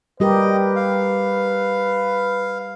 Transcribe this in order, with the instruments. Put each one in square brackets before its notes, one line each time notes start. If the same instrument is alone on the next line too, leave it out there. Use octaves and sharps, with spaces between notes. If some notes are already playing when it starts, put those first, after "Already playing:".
[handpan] G3 G4 A#4 [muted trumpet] B4 [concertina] D#5
[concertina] F5